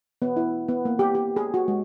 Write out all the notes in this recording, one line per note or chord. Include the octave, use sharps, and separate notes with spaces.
B3
E4
B3
A#3
G4
G4
G#4
F#4
G#3